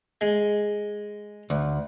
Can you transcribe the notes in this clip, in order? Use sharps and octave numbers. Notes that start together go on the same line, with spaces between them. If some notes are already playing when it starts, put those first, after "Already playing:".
G#3
D2